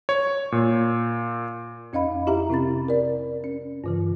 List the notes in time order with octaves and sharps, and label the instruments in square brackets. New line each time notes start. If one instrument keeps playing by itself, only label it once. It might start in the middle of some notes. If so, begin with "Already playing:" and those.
[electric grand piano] C#5
A#2
[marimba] F2 C#4 D#5 F5 B5
E4 G4 E5 A#5
C3 C4 C#4 B5 A6
A#4 D5
C#4
G2 C#3 E3